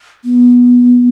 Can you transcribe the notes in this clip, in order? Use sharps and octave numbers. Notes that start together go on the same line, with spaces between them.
B3